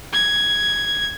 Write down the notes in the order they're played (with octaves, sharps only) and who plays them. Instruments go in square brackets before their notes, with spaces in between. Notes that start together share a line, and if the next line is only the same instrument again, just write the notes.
[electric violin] G#6